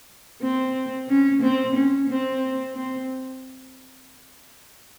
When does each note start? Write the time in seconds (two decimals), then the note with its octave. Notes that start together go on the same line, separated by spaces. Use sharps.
0.42 C4
1.09 C#4
1.42 C4
1.75 C#4
2.09 C4
2.75 C4